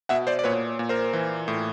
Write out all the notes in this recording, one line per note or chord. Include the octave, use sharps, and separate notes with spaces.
B2 E5 F#5
C5 D5
D5
A#2 B4 C#5
A#2
A#4 C5
E3
A2